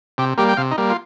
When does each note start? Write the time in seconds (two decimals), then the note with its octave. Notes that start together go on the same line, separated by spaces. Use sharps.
0.18 C3 G4
0.38 G3 A#3 G4
0.49 G5
0.57 C3 F5
0.71 D#4
0.78 G3 A#3
0.90 F4